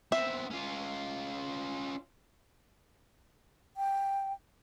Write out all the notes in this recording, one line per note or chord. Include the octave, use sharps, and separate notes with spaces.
B3 C4 E5
C#4 F4
G5